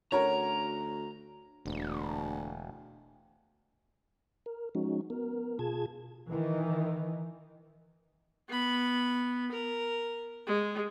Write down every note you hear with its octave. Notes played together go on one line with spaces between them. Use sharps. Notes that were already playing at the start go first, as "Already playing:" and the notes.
D2 C#4 F#4 A#4 C#5 A#5
E1 D2
A#4
F3 G#3 C#4 D#4 F#4
B3 A#4
B2 F4 G#4 A5 G#6
D#3 E3
B3 B5
A#4
G#3